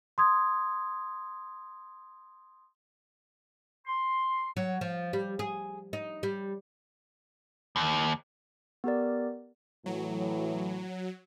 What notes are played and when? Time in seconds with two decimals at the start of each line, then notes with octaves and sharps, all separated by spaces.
0.18 C6 D#6 G#6
3.87 C6
4.57 F#3
4.81 F3
5.13 G3
5.39 G#4
5.93 D#4
6.23 G3
7.76 D#2
8.84 B3 G4 A#4 D5
9.86 A2 E3 F#3